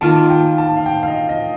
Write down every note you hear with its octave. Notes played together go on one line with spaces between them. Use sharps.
D#3 A#3 F4 A5
G5
A5
F5
G5
F5
D#5
D#5